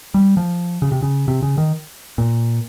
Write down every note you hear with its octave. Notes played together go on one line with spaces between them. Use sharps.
G3
F3
C#3
C3
C#3
C3
C#3
D#3
A#2